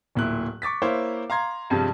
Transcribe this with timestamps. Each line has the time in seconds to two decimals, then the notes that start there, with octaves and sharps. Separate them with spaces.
0.15 D1 A#2 E4 F#6
0.62 C#6 D6 A6 B6
0.82 A#3 E4 C5 C#5 F5
1.30 F5 A#5 C6 G#6
1.70 G2 C3 F3 G3 G#3